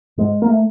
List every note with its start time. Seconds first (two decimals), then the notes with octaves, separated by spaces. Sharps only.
0.17 G#2 G#3
0.42 A#3
0.50 A3